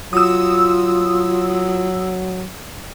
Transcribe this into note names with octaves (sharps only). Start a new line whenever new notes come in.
F#3 F4 D#6 E6